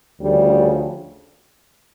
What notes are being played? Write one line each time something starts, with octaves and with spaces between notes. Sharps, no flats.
D2 C#3 F3 G3